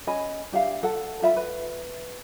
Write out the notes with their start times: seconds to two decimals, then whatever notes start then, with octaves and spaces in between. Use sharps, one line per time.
0.07 C#4 D#5 G#5 B5
0.52 D4 G4 E5 F5
0.83 A4 F#5
1.22 F4 E5 B5
1.37 B4